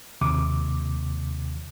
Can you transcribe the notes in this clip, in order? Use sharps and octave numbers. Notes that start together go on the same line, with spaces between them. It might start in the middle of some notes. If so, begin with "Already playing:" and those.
D#2 C3 D6